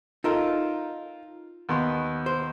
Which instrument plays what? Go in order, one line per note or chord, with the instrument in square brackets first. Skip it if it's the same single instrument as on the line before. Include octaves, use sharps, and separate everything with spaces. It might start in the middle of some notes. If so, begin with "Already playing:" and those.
[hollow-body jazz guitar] D#4 A4 A#4 [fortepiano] F4
[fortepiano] D#2 B3 C6
[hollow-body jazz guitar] C5